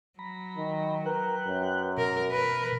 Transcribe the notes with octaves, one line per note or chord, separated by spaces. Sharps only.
F#3 A#5 B5
D#3
A#4 B4 G5 F#6
F#2
B2 A#4
A#4 B4